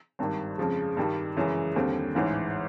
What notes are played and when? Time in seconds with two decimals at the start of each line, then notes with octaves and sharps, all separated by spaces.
0.19 G#1 G2 D#3 G3
0.58 F2 C#3 F3 G#3
0.97 G2 D#3 G3
1.36 F#2 C#3 E3 G#3 C#4
1.76 D#2 D3 G3 C4
2.15 A1 G#2 E3